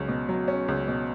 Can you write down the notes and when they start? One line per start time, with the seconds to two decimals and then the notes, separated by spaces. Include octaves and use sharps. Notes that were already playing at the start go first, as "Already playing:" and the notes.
Already playing: C#2 F#3 C#4
0.08 B2
0.29 F#3
0.48 C#4
0.68 C#2
0.88 B2